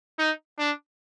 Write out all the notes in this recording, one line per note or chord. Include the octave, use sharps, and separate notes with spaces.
D#4
D4